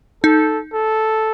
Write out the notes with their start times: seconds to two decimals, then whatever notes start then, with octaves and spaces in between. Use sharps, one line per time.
0.24 D#4 A4
0.73 A4